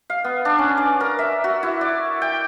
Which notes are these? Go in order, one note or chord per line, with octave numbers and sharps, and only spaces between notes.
F5
B3
D4
C#4
D5
A#4
E5
F#4
E4
D5
G5